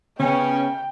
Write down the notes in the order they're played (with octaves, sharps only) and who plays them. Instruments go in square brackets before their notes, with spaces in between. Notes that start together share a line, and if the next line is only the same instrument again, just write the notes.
[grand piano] C#3 [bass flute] B3 [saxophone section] C#4 [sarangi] G5